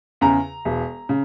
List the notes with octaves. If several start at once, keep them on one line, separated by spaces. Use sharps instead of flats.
E2 C#3 A#5
E1
C#3